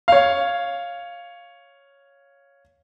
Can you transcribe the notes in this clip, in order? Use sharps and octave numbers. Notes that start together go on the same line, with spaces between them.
C#5 F5